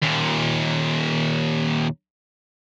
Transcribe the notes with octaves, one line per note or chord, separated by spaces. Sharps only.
D#2 A#2